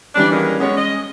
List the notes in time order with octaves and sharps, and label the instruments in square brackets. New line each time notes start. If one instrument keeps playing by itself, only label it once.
[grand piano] E3 G3 C#4 [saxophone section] D4
[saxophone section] D#3 G#3 A#3
[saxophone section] F#3 B3 C#5 [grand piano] G#3 C#4
[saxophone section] D#5